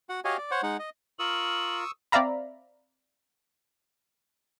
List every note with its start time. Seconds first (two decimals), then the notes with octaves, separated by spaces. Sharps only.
0.09 F#4 F#5
0.25 F#4 G4 C#5 D#5 F5 G#5
0.37 D5
0.51 C5 C#5 F#5
0.63 G#3 D#4 F#5
0.79 D#5
1.19 F4 A#4 C#6 D#6 E6 F#7
2.12 C4 D5 E5 F5 A#5 B5